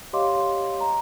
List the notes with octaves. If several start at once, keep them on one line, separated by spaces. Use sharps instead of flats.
G4 C#5 D#5 F5 C6 D6
A#5